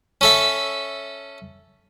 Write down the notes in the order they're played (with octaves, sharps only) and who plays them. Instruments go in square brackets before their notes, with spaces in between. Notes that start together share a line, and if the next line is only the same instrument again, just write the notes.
[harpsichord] C#4 A4 E5